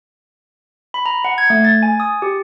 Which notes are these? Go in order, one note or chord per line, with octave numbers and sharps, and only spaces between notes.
B5
A#5
F#5
G#6
A3
A6
G#5
D#6
G4